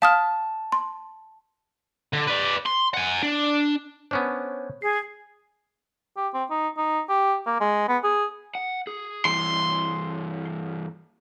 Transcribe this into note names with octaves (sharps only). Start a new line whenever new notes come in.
F5 A5 D#6 F6
C6
D3
B4 D5
C6
F#5 G#5
D4
B3 C#4 D4 C5 C#5
G#4 C7
G4
C4
D#4
D#4
G4
A#3
G#3
B3
G#4
F#5
G#4
G2 E3 C6